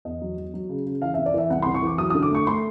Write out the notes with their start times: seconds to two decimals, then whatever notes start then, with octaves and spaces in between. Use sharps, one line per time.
0.05 E2 D#5
0.21 F#3
0.37 F#3
0.54 F#3
0.69 C#3
0.86 C#3
1.02 E3 F5
1.14 E5
1.18 C3
1.26 D5
1.34 E3 E5
1.50 C2 F#5
1.62 C6
1.66 C3
1.74 C#6
1.82 E3 D6
1.98 F#3 D#6
2.10 D#6
2.15 D3
2.23 D6
2.31 A3 C#6
2.47 A3 C6